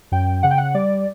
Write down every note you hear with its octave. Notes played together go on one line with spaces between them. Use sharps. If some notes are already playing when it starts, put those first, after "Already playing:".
F#2 G5
C#3 F#5
G5
F#5
G3 D5